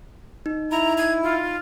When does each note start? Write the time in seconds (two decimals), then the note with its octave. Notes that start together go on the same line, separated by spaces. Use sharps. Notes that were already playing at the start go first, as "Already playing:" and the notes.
0.46 D#4
0.71 E4 A#5
0.98 G#6
1.23 F4